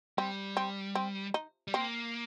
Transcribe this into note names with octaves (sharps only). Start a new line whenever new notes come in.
G3 C4
C4
C4
D#4
G3
A#3 C4